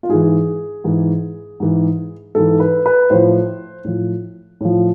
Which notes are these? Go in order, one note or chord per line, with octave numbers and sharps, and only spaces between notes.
F4
G#2 E3 G#4
G#2 E3
G#2 E3
G#2 E3 A4
B4
B4
A2 F3 C5
A2 F3
A2 F3